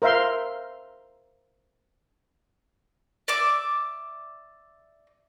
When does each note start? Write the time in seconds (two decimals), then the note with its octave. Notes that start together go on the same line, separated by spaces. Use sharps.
0.02 A#4 C5 E5 F5 C6
3.28 D5 E5 D6